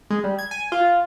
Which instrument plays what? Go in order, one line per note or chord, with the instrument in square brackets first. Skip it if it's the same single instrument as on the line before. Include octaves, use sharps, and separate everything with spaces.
[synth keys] G#3
G3
G#6
G#5
F4